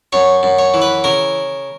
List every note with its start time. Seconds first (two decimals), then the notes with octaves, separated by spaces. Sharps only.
0.12 F#2 C#5
0.43 F#2
0.59 C#5
0.74 E3
0.82 B4
1.04 C#3 A#4